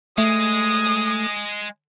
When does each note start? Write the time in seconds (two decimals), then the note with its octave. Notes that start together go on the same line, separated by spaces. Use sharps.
0.18 G#3 A3 D#6